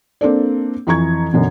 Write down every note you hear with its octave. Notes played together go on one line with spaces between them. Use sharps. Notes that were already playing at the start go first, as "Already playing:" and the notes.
A#3 C4 D4 A4 D5
F2 E3 A#5 C#6 G#6
F#2 B2 D3